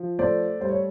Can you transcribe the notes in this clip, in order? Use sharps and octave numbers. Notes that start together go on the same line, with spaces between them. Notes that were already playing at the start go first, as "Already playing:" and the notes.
Already playing: F3
A3 C5 D5
G3 C5
C#5